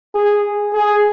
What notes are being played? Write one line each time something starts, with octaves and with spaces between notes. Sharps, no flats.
G#4
G#4